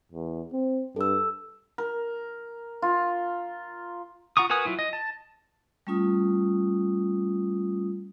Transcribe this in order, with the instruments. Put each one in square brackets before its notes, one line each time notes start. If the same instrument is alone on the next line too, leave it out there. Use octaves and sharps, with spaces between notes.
[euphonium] E2
C4
[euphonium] G2 [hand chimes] A4 E6
[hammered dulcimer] A#4
F4
[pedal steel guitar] F4 F#5 A#5 C#6 D#6
F#4 A#4 B4 G#5 D#6
F#3 E4 F4
D#5
A5
[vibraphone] G3 A3 C#4 F4 D#6